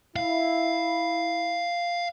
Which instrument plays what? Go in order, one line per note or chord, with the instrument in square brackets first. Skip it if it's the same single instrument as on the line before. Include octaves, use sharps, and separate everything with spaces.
[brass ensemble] E4 [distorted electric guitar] F5